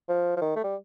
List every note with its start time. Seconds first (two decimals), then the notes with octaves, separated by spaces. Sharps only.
0.09 F3
0.37 F3
0.41 D#3
0.56 A3
0.64 G3